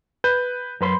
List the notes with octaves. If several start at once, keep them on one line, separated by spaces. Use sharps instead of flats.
B4 G6
F#2 B4 C6